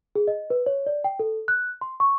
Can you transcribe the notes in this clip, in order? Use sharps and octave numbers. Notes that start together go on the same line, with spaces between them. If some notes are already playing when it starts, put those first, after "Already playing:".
G#4
D#5
B4
C#5
D5
G5
A4
F#6
C6
C#6